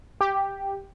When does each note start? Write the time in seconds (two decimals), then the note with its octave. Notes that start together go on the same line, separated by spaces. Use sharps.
0.21 G4